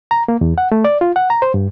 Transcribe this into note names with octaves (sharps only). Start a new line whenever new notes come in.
A#5
A#3
E2
F#5
A3
D5
F4
F#5
A#5
C5
G2